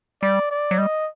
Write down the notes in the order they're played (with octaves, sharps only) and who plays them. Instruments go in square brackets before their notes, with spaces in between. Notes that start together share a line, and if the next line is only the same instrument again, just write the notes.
[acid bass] G3 [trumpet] D5
[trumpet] D5
[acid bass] F#3
[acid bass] G3 [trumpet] D#5